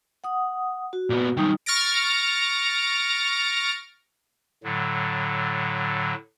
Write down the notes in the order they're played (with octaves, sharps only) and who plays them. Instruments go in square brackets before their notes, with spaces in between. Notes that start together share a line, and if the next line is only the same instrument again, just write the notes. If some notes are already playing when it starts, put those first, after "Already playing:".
[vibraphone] F#5 D#6
F#4
[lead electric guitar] A#2 B3
[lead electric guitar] D#3 F#3 [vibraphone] G3 D#4 D#6
[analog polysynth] C#6 F6 A6 A#6 D7
[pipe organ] A2 D3 F#3